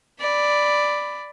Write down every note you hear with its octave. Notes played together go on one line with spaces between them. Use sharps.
D5 B5